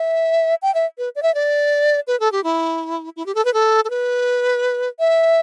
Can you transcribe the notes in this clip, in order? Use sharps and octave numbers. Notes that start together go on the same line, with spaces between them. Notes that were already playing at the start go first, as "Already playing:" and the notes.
Already playing: E5
G5
E5
B4
D5
E5
D5
B4
A4
G4
E4
E4
G4
A4
B4
A4
A4
B4
E5